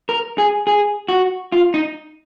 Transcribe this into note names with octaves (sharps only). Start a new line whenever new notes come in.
A#4
G#4
G#4
F#4
F4
D#4